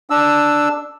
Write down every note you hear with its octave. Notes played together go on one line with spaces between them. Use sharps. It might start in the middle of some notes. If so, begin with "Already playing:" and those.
D4 E6